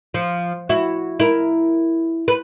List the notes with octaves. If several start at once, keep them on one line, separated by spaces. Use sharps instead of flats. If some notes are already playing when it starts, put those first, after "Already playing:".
F3
E4 F#4
E4 A#4
B4